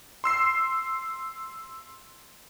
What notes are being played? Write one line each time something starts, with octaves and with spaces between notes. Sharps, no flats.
C6 E6 C7